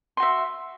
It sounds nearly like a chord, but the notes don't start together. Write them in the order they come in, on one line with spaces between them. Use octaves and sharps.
C6 F#4 E5